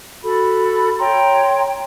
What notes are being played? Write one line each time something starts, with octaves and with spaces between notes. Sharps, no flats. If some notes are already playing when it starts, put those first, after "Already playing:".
F#4 A4 B5
C#5 G5 A#5 C6